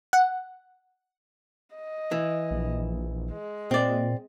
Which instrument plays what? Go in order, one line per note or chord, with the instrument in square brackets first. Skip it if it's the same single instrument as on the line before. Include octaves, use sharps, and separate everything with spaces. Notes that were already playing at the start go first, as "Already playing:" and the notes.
[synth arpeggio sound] F#5
[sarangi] D#5
[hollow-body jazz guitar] E3
[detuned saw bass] A#1
[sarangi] G#3
[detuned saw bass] A#2 [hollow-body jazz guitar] C4 D5